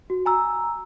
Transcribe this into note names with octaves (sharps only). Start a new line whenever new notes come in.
F#4
G#5 A#5 E6